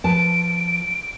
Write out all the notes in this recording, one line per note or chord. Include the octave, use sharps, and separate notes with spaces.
F3 B4 A5 D7